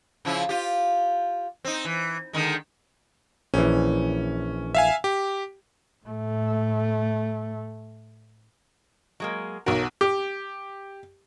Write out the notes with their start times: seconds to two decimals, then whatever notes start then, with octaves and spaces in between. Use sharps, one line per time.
0.25 C#3 F3 E4
0.49 F4 G4
1.65 C4 D#4
1.85 E3
2.33 D3 D#3 G#3
3.54 A#1 E3 C#4
4.75 E5 F5 G#5
5.04 G4
6.06 A2 A3
9.20 F#3 G#3 A#3
9.66 B1 F#4 A#4 C#5
10.01 G4